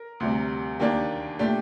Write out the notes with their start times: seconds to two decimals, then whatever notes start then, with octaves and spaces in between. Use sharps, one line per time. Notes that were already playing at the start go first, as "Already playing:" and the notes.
Already playing: A#4
0.20 D2 C3 G3
0.80 D#2 D#3 A#3 D4 G4
1.39 A#2 A3 D4 G4